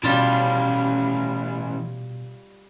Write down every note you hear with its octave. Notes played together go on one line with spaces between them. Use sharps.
B2 E3 G3 C#4 F4 A5